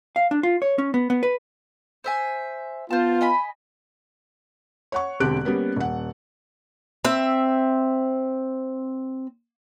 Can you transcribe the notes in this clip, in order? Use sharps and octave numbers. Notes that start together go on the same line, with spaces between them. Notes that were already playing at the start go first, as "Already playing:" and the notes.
F5
D4
F4
C#5
C#4
B3
B3
B4
C5 E5 G#5
B3 F4 C5 A5
D#5 G#5 B5
C#5 F#5 C#6
E1 D3 C4 G4 F#6 D7
G3 A#3 B3 C#4
D#1 F#5
C4 E5